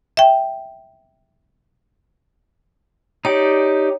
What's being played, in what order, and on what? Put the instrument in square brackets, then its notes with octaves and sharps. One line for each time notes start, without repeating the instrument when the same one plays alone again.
[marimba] E5 G5
[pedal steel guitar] D#4 G4 D5 [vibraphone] C#5